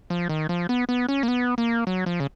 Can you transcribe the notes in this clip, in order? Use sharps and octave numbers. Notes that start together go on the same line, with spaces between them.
F3
D#3
F3
B3
B3
C#4
A#3
B3
A#3
F#3
F3
C#3